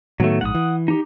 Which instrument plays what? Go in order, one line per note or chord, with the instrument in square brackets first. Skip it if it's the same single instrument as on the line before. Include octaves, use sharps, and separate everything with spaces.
[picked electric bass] A2 D#3 B3 [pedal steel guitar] F#3 A3
[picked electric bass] A#1 G#2 [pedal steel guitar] F#5 D#6
[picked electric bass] E3
[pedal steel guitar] D#4 G4